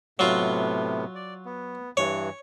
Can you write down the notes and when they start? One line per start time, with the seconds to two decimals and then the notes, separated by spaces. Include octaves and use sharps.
0.19 A2 C3 F#3 B3 F4
1.15 D5
1.45 B3
1.97 G2 E3 C#5